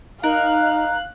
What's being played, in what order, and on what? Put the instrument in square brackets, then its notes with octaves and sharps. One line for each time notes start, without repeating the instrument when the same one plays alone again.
[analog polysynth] D#4 [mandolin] A#4 [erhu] F5 [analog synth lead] F#6